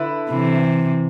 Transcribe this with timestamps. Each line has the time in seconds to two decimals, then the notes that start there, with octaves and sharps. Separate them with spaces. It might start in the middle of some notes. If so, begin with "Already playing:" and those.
Already playing: D3 E4 B4
0.31 C3 E3